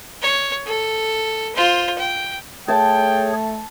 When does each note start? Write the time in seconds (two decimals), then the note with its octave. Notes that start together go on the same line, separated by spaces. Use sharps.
0.22 C#5
0.66 A4
1.55 F4 C5
1.98 G5
2.68 A3 G#4 C#5 G5 A5